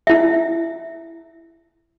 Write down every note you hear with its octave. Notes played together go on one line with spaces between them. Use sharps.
E4 E5